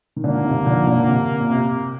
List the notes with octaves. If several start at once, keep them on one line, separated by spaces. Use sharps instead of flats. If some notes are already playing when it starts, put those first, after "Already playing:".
D#3
A#2 D3 A#3
C3 D#3
D3 F3
A#2 D3
C3
A#2
C3